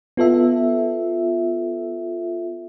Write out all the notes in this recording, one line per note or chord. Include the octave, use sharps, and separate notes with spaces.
B3 F4 A4 E5